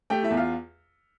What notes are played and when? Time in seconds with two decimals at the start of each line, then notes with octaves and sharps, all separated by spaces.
0.10 A3 G4 G5
0.23 E4 E5
0.31 E2
0.37 F4 F5